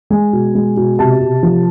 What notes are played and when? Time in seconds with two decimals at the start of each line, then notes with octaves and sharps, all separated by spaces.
0.10 G#3 G#5
0.33 B2
0.55 G#3
0.77 B2
0.99 C3 A5
1.21 C3
1.43 F3